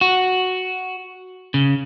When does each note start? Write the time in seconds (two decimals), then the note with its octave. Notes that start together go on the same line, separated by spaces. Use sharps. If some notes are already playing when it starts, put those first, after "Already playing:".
0.01 F#4
1.54 C#3